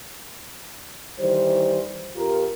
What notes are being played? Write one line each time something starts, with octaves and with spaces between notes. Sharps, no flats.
D#3 E3 G3 C5
F2 F4 G4 A#4